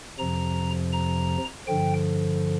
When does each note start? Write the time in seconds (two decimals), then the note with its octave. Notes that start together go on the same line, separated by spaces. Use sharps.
0.19 F2 C3 F3 A#5
0.93 A#5
1.67 G2 D3 F3 G5